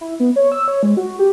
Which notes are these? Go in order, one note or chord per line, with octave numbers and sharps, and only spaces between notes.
E4
B3
C#5
E6
C#5
G#3
F#4
G4